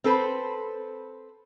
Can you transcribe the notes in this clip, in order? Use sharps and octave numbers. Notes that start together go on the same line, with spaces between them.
C4 A4 B4 C5